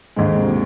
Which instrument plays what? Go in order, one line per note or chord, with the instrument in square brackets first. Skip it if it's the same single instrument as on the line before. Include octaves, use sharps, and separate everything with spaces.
[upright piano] D#2 D3 G#3 [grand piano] G#2
[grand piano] C3
A#2